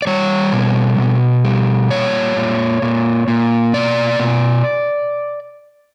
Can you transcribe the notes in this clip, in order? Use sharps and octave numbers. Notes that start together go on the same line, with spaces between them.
D5
G3 C#5
B2
B2
G3
A#2 C#5
A#2
A#2
A#2
B2 D5
B2